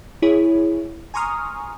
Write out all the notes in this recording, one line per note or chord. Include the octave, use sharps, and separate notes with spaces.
E4 G#4 C#5
G#5 A#5 C6 C#6 D#6 F6